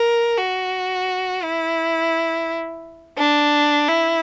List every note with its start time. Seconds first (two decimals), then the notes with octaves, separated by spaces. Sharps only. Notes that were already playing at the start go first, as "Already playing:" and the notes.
Already playing: A#4
0.38 F#4
1.43 E4
3.18 D4
3.88 E4